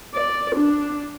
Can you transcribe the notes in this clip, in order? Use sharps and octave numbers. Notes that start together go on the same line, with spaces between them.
D5
D4